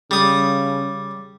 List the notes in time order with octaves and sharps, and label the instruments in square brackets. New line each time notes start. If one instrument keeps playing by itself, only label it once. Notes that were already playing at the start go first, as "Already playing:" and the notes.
[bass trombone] C#3 [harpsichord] G3 D#6